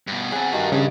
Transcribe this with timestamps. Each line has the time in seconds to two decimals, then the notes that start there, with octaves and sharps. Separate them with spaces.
0.07 G2 B2
0.32 C4 G#4 F#5 G#5 A5
0.53 G2 D#3 F#4 A#4
0.72 C#3 G3 D4